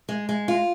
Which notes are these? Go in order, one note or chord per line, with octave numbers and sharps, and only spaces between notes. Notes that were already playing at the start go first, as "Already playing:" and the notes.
G#3
G#3
F4